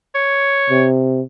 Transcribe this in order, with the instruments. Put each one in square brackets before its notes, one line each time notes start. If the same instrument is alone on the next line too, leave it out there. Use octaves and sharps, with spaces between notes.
[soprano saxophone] C#5
[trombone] C3